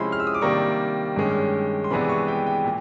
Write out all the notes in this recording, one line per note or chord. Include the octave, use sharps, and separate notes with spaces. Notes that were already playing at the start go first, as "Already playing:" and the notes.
Already playing: C3 F3 G#3 C#4 E4 B5 C6
F6
E6
D#6
D6
C3 D#3 G3 A#3 D4 C#6
G2 D#3 G#3 C#4
C6
C3 E3 G#3 B3 D4 B5
C#6
G5
G5
A#2